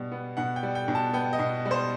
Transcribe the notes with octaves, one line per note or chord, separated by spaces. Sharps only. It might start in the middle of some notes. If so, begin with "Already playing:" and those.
Already playing: B2 G3
B3
B2 F#5
G5
G3
G5
B2
A5
B3 G5
D#5
B2
G3
C5